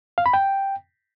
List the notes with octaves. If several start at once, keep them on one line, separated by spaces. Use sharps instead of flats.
F5
B5
G5